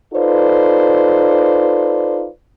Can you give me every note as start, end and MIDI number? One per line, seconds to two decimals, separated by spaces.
0.14 2.28 63
0.14 2.28 65
0.14 2.28 69
0.14 2.28 71
0.14 2.28 72
0.14 2.28 74